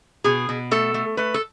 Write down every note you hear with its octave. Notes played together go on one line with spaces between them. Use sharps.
B2 G#4
B2
A3 A4
A3
A3 B4
A4